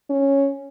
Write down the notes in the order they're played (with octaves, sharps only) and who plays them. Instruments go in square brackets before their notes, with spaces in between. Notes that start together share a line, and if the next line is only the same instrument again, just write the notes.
[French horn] C#4